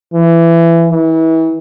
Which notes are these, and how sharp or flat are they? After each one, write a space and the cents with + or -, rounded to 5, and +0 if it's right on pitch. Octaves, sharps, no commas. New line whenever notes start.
E3 +20
E3 -30